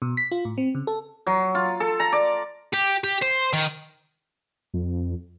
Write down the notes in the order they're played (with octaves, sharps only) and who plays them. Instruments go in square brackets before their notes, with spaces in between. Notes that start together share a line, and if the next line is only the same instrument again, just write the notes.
[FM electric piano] B2
B6
F4
A2
C4
C#3
A4
[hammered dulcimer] F#3
F4
A4
A#5
D5
[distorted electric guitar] G4
G4
C5
D#3
[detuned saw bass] F2